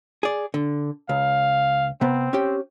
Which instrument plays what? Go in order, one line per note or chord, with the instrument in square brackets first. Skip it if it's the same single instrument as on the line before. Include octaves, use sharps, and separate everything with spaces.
[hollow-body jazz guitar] G#4 D5
D3
[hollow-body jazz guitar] C#2 [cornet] F5
[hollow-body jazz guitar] C3 B3 [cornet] C4
[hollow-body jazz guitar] C#4 G4